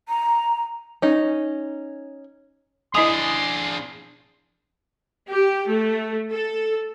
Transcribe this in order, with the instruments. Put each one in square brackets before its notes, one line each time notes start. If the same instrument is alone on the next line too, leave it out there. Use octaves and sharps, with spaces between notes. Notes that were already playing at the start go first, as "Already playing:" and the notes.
[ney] A#5
[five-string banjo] C#4 D#4
[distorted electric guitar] D4 G#4 [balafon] E4 D#5 G#5 [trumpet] C6 [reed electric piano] D#6
[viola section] G4
A3
A4